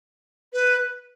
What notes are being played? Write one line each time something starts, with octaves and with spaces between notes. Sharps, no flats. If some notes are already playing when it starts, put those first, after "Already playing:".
B4